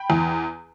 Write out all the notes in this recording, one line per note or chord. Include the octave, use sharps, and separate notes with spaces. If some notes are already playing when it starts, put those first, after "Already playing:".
Already playing: G5 B5
E2